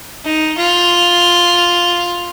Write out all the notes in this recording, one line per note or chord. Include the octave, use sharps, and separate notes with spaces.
D#4
F4